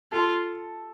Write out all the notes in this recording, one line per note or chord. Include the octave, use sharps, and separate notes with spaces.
F4 A4 A5